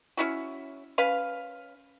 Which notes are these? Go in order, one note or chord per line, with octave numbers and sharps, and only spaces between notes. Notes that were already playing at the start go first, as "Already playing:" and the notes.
C#4 E4 F#4
C#4 B4 F5